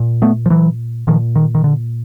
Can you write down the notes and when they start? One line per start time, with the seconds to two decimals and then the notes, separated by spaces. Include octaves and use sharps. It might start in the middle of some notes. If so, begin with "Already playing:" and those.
Already playing: A#2
0.22 A3 B3
0.46 F3
0.50 E3 F#3
1.07 A#2 D#3 F3
1.36 D#3
1.55 D#3
1.64 D3